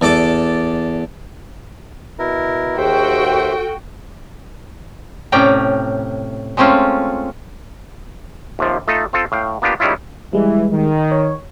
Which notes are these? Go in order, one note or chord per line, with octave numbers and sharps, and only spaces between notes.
E2 A4 D5 A5 D6
B2 E4 A#4
D#2 F#4 G#4 C5 E5 G5
A4
A2 C3 C#4 D5 G5 A#5
G#3 A3 C4 C#4 F4
D#2 C3 F3
A3 D#4 F4 A4
C4 F4 A4
A2 F5 G5
A#3 B3 D4 F4 G4
D#3 G3 G#3 C#4 E4 F4
E3 G3 G#3
D#3
C#5